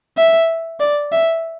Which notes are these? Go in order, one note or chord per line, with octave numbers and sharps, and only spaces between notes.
E5
D5
E5